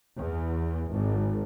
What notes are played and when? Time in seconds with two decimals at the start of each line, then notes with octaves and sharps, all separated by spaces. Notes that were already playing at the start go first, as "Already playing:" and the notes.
0.18 E2
0.92 G#1